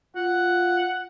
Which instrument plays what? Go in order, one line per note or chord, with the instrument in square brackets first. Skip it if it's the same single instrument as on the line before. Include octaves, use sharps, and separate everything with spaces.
[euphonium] F4 [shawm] F#5